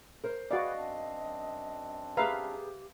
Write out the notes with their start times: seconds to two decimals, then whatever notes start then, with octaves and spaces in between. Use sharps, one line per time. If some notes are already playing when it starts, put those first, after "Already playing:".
0.24 A#4 C5
0.51 F#4 G#4 B4 D5 D#5 F5 G#5
0.77 F#2 C4 D4
2.17 B3 G4 G#4 B4 E5 F5 A#5